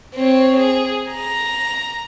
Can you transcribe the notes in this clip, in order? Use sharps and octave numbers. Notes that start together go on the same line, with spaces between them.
C4 C#5
G#4
A#5